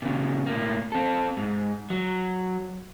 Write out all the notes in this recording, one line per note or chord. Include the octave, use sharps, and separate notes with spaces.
A#2 C#3
A2 A#3
C4 A4
G#2
F#3